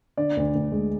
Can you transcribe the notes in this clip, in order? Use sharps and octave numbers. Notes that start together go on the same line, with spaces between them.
D3 D5
D2
D2
G#3